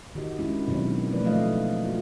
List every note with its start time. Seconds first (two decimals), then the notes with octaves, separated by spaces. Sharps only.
0.15 D#3 F#4 G4 D#5
0.39 G#3 C#4 D4 E4
0.68 B2 D#3 F#3 C4
1.11 F3 A3 B4 D5
1.24 D#3 A3 A#3 C#5 D#5 F5
1.84 F4 F#4